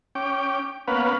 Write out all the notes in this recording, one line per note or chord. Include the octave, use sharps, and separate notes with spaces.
C#4 G5 D6
A#3 B3 C#4 B4 F5 F#5